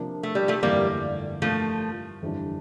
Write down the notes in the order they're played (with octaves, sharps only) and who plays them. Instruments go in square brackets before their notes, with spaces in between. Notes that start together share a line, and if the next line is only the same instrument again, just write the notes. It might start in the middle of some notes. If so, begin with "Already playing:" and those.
Already playing: [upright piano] C3 F3 A#3 D4
[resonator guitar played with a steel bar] A3
G3
F3 A3
[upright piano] G1 F2 E3 A3 [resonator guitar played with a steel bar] G3 A#3
[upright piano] G2 E3 A#3 [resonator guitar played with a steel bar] F3 A3
[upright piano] G1 F2 E3 G3 D4